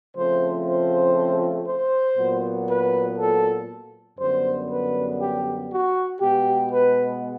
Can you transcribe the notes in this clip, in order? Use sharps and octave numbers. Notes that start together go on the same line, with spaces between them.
C#3 F3 A3 C4 C5
C5
C5
A#2 F#3 B3
B4
A4
F#2 D3 G3 B3 C5
B4
G4
F#4
B2 G#3 B3 G4
B4